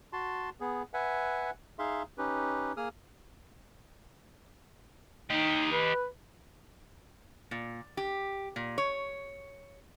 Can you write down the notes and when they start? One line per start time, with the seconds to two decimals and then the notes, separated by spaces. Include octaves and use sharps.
0.13 F#4 A5 C6
0.60 B3 G#4
0.94 B4 E5 F#5 G#5
1.79 D#4 G#4 E5 F5 C6
2.18 C#4 D#4 G4 B4
2.77 A#3 G#4 D#6 F6
5.30 D#4 G4 D#5
5.72 B4
7.51 A#2
7.97 G4
8.56 A#2
8.78 C#5